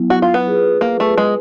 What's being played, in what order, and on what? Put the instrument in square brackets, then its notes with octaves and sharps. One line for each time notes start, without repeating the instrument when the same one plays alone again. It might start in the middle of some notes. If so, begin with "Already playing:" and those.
Already playing: [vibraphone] F#3 B3 E4
[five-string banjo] F#4
F4
B3
[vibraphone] F4 G#4 B4
[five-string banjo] A#3
A3
G#3